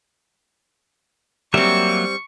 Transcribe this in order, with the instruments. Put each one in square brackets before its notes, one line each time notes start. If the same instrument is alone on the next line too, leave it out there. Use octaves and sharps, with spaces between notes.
[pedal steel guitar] F#3 A#3 E5 [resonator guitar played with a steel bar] G3 C4 [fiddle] C#6